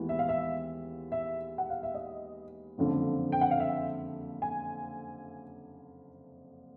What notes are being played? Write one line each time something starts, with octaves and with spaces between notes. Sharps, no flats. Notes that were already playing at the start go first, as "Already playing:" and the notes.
Already playing: D#2 E3 G#3 B3
E5
F5
E5
E5
F#5
F5
E5
D#5
F#1 F2 D3 F3
G5
F#5
F5
E5
G#5